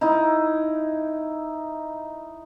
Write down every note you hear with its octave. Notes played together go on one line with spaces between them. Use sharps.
D#4 E4